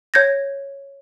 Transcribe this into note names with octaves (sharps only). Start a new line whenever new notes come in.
C#5 G6 G#6 A#6